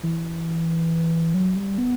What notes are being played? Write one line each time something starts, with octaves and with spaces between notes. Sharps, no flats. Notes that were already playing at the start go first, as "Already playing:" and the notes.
E3
F#3
G3
B3